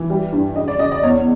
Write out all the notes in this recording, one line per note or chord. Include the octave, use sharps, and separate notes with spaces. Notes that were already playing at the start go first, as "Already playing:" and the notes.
Already playing: E3
G3
G2
C#3 D#5
D5
C#3 D#5
D5
E2 C#5